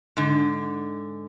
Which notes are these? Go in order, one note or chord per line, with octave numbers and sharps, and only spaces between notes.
G#2 D3